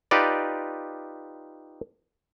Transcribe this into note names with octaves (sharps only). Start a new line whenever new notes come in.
D#4 F4 G4 B4 D5